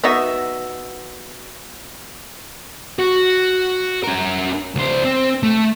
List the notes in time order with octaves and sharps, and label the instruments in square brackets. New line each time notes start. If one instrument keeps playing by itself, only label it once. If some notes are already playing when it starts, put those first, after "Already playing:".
[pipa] B3 D#4 F#4 E5
[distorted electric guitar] F#4
C#4 A#4
C#2 C5
C4
A3